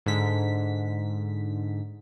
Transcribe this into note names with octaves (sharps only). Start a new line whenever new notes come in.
G#2 D3 B6